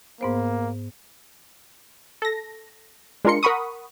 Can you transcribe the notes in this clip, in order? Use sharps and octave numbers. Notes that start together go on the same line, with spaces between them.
G#2 A#3 B3 C5
A4 A#6
G#3 D4 F4 A#4 C6 C#7
A#4 F#5 B5 C#6 D#6